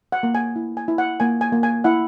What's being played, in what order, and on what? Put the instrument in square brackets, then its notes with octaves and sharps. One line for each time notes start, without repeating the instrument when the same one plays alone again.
[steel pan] F#5
A#3
G#5
E4
G#5
E4
F#5
A#3 G#5
G#5
A#3
G#5
E4 F#5